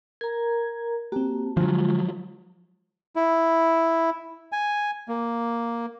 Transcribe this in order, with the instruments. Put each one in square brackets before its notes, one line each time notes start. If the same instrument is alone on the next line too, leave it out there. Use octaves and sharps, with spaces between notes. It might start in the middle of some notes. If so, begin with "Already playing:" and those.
[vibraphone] A#4 A#5 [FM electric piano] G#6
[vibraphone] A#3 F#4 A5 [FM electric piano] C4 G4
[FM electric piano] D3 [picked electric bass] F3 F#3 [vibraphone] G#3 F4
[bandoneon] E4
G#5
A#3